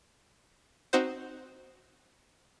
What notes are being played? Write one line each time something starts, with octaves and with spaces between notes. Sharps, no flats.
C4 D#4 F#4 C5